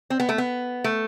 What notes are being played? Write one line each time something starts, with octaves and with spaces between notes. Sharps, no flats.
C4
B3
A3
B3
A3